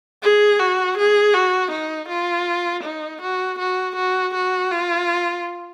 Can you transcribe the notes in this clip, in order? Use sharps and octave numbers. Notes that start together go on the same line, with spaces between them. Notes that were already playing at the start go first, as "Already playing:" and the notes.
G#4
F#4
G#4
F#4
D#4
F4
D#4
F#4
F#4
F#4
F#4
F4